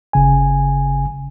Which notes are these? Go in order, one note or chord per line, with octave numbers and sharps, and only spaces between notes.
G1 C#3 G#5